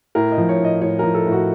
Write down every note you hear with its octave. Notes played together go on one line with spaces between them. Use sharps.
A2 A#4
D#5
F3
C#5
A2 D#5
A2 C#5
F3 A#4
A4
A2
F#4